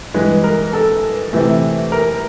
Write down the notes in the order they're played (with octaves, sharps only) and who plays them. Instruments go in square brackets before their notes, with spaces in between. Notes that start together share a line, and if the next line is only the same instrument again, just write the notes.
[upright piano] G2 E3 G#3 B4
A#4
A4
C3 E3 A3
A#4